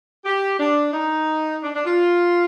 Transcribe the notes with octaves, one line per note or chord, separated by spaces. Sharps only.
G4
D4
D#4
D4
D4
F4